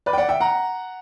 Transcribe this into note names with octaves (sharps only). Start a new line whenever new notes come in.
B4 D5
G5
D5 F#5
E5 G5
F#5 A#5